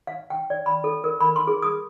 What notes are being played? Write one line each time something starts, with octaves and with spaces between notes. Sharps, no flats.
F5
G5
D5
B5
A4
A#4
B5
C6
G#4
D#6